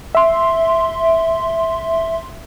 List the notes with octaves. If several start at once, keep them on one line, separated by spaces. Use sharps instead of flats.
E5 C6